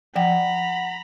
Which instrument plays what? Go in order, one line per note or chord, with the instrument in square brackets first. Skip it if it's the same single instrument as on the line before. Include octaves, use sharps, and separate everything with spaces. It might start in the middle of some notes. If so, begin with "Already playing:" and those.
[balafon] F3 G5 [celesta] F#5 [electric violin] A#5 B5